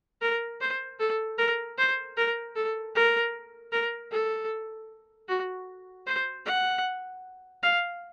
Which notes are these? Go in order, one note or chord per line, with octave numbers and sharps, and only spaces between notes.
A#4
C5
A4
A#4
C5
A#4
A4
A#4
A#4
A4
F#4
C5
F#5
F5